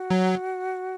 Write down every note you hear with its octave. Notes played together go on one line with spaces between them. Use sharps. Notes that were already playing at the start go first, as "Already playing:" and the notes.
Already playing: F#4
F#3